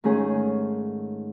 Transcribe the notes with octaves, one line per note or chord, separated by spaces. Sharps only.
G#2 D#3 A3 C#4 G#4